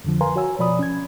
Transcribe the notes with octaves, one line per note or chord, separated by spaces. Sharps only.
F2 D3 F3
A#4 B4 F5 G#5 A#5 C6
F#4 C#5 G#5 E6
B2 F3 D5 B5 D#6
C#4 G#6